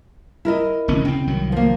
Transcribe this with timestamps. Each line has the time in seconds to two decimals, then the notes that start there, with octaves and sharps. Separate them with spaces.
0.45 E4 A#4 D#5
0.88 F1 D2 C#4
1.05 C#3 C4 G5
1.27 C2 D#3 F#3
1.52 F3 A#3